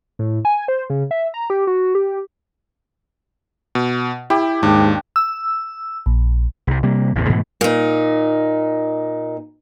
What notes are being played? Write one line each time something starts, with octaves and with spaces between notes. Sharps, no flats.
A2
G#5
C5
C#3
E5
A#5
G4
F#4
G4
B2
E4 G4
D#2 G#2 D4
E6
A#1
C2 C3
C3 G3 A#3
A1 E2 A2 C3
G#2 B2 E3 A3
A#2 D#4